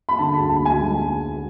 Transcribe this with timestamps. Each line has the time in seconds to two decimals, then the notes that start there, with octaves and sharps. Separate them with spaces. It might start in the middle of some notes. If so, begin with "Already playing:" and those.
0.09 B5
0.18 D3 A5
0.34 B5
0.39 D2
0.49 A5
0.59 D2
0.65 G#5
0.80 G#3